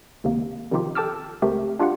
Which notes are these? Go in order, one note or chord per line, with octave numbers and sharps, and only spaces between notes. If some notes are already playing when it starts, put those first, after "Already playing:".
C#2 C3 D#3 A#3
C3 D#3 F3 D#4 F4 G4
A4 G5 A5 D6 E6 F6
C#2 A3 C4 G4 A#4
D4 F4 G4 F5 F#5